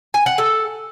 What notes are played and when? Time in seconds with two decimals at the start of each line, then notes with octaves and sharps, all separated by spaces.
0.14 G#5
0.26 F#5
0.38 A4